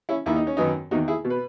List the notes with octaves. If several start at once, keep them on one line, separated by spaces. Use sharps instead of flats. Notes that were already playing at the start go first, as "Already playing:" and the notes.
C#4 E4
D#2 D#3 E4
D#4
C#4
F#2 D#3 B3 D#4
E2 D#3 D#4 F#4
E4 G#4
B2
B4